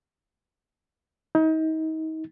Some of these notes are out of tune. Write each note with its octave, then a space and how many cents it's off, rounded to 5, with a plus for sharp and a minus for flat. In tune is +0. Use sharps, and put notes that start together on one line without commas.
D#4 +35